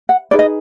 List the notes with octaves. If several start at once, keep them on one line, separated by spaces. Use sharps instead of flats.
F#5
D#4 G#4 B4 D5
D#5